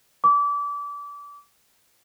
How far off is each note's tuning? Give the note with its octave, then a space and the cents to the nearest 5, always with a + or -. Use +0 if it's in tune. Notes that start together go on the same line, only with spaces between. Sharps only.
D6 -30